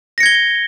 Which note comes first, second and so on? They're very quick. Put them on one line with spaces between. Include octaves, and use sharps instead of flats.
A#6 C#7 G#6 G7